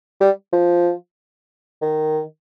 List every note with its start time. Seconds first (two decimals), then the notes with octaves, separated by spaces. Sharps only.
0.20 G3
0.53 F3
1.82 D#3